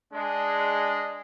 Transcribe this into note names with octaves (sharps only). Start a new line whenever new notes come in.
G#3 D4